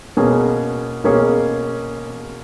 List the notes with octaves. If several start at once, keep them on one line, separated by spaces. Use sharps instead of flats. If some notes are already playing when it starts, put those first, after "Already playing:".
B2 A#3 C#4 G#4
B2 A#3 C#4 G#4